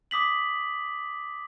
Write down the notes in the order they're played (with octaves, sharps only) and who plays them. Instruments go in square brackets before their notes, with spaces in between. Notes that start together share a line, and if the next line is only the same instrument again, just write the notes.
[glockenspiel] D6 D#6 B6 F#7